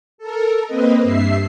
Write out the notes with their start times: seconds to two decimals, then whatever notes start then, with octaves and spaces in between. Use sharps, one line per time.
0.18 A4 A#4
0.67 A#3 C4 B4 D#5
1.03 G2 E5 C7